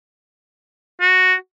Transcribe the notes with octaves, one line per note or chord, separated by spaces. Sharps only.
F#4